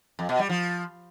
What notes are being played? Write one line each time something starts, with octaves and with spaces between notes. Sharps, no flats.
F2
B2
G3
F3